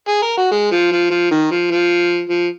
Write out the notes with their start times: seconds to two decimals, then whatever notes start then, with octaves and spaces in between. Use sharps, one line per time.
0.08 G#4
0.22 A#4
0.38 F#4
0.51 G#3
0.72 F3
0.92 F3
1.11 F3
1.31 D#3
1.51 F3
1.71 F3
2.29 F3